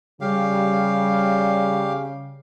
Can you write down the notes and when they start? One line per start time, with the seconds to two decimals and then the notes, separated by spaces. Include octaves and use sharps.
0.21 C#3 G3 G4 F5